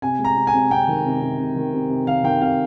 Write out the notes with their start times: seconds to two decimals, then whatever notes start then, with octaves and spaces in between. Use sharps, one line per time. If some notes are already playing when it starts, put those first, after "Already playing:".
0.02 C3 G#5
0.19 G#3
0.24 A#5
0.36 C3
0.47 G#5
0.54 C3
0.71 C3 G5
0.88 D#3
1.05 C3
1.22 C3
1.39 C3
1.56 D#3
1.73 C3
1.89 C3
2.07 D#3 F5
2.23 D#3 G5
2.41 C3 F5